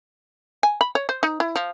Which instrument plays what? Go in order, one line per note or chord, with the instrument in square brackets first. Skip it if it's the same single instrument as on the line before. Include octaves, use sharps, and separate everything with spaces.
[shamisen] G#5
B5
C#5
C5
D#4
E4
F3